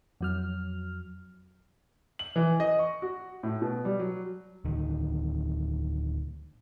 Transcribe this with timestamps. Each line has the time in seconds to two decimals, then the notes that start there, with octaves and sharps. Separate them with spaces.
0.21 F2 F#3 F6
2.19 F#7
2.36 E3
2.60 D#5
2.79 C#6
3.02 F#4
3.43 A2
3.62 B2
3.85 G3
4.00 F#3
4.65 D1 D3 D#3